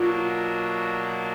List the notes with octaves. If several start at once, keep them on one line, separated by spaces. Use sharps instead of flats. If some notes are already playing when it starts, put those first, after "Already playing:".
Already playing: B2 F#3 A#3 D4 F4